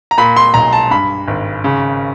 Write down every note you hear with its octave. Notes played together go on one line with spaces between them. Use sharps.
A#5
A#2 B5
C6
B1 A#5
A5
G2 B5
G#1
C#3